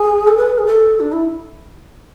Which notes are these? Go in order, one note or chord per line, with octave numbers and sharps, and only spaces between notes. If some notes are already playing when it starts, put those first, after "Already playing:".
Already playing: G#4
A4
B4
G#4
A4
D4
E4